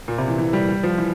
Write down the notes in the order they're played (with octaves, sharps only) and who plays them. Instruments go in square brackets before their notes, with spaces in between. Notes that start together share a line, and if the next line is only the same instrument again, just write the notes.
[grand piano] A#2
C3
E3
E3
G3
G3
F3
E3